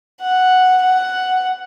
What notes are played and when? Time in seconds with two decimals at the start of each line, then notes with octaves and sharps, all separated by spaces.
0.21 F#5
0.82 F#5